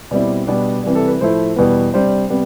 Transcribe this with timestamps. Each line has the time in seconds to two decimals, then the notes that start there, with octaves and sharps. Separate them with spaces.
0.11 B2 G3 C4 E4 D5
0.47 B2 G3 B3 D4 D5
0.84 C3 E3 G3
0.95 A4
1.08 B4
1.21 A2 F3 A3 E4 C5
1.56 E2 B2 G3 B3 B4
1.93 C3 G3 D4 C5
2.30 C3 G3 B3